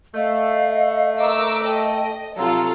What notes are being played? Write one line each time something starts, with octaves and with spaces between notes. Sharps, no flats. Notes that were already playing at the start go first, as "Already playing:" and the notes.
A3 D#5 F5
A#4 D6 E6
A4 D#5 G5 A5
C3 F3 F#3 F4 A4 F5 A#5 E6